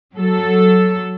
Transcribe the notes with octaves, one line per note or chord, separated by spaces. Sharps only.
F#3 A4